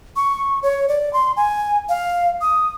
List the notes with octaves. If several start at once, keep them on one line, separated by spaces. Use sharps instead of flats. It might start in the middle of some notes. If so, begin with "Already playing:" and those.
C#6
C#5
D5
C6
G#5
F5
D#6